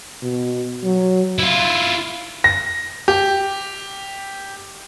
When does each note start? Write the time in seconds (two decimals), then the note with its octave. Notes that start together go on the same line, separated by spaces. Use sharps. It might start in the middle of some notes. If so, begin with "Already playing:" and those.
0.22 B2
0.83 F#3
1.39 E4 F4
2.44 A#6
3.08 G4